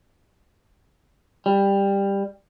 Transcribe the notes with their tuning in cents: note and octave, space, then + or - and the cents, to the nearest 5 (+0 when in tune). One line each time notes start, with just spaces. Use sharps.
G3 +15